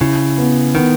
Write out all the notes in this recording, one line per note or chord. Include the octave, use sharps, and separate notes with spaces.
C#3 E4
B3
D#3 B3